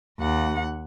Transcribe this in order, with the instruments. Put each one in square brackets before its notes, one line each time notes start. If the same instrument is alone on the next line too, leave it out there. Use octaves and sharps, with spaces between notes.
[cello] D#2 F#5